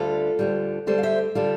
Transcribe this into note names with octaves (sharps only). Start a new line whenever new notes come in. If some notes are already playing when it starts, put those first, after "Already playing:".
Already playing: D2 D3 G3 F4 A4
D2 D3 G3
D2 D3 G3 A4 C5
F5
C5 E5
D3 G3 F4 A4